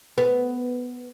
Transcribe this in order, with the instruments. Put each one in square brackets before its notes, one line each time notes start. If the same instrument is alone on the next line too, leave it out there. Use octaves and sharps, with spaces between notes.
[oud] B3